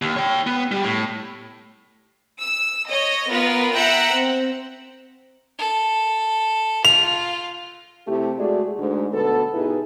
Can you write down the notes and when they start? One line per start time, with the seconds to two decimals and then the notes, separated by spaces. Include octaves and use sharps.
0.02 D#2
0.16 C#5 G5
0.47 B3
0.71 G3
0.84 A2
2.40 E6
2.88 C#5 D#5
3.29 B3 F4 A#4 B4
3.74 E5 F#5 G5 A#5 E6 F#6
4.13 C4
5.58 A4
6.85 F4 F7
8.08 C3 A3 E4 G4
8.39 G#3 A3 F#4 G#4 D5
8.78 D2 G#2
9.13 D2 B2 B3 A4
9.54 B2 D#4 E4 G4 G#4 B4